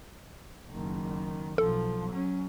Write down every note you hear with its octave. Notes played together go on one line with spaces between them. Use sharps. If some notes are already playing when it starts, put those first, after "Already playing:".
F#1 D#3
B1 F3 A4
F#3 C#4